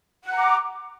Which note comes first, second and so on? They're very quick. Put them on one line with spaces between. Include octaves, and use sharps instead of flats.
F#5 F#6 A#5 D6